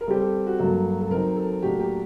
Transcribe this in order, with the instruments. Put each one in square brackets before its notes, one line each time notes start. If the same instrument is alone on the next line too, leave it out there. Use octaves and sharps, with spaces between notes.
[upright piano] A#4
[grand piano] G3 C4 G4 [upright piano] A4
[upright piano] A4
F#4
[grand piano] G2 F#3 A#3 [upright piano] A4
[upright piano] A4
[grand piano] F#3 C4 D#4 [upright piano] A#4
[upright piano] A4
[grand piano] A2 F#3 A#3 D4 F#4 [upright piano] G4
[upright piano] G4